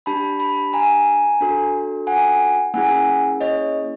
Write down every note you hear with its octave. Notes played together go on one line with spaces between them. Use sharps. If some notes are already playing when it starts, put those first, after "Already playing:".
D4 G4 A5 B5
A5 B5
G#5 A#5
D4 F#4 A4
F#5 G#5
A#3 C#4 E4 G#4 F#5 G#5
C#5 D#5